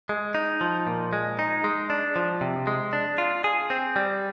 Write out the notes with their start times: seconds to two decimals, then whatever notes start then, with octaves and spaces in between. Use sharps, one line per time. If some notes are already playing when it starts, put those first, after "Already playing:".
0.09 G#3
0.35 D#4
0.61 F3
0.87 A#2
1.13 G#3
1.39 D#4
1.64 G#3
1.90 D4
2.16 F3
2.41 C3
2.67 G#3
2.93 D4
3.18 F4
3.44 G#4
3.70 C4
3.96 G3